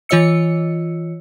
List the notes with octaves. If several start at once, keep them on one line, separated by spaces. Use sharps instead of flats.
E3 F4 C#5 D#5 E6 C#7